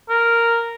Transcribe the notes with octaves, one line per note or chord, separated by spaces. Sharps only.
A#4